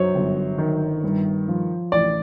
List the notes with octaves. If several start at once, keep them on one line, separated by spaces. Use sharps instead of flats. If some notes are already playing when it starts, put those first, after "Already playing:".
Already playing: F#2 F#3 C5 C#5
G1
D#3
G2
F3
A1 D5